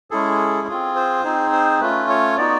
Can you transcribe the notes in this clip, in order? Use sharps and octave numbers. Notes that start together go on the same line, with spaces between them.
G#3 C#4 E4 G#4 A4
C4 F4 G#4
C5
C4 D#4 G#4
C5
A3 C#4 F4 B4
C#5
B3 D#4 F#4 D5